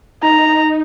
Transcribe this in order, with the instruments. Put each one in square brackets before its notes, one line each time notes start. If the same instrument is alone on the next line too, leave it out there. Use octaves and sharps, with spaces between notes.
[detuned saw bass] D#4 [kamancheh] A#5